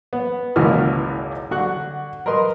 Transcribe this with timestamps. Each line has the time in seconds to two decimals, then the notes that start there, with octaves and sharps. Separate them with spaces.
0.13 B3
0.56 G#1 C#2 B2 E3 A#3 F6
1.51 D3 F#4 F#6
2.26 A#4 B4 D#5 C6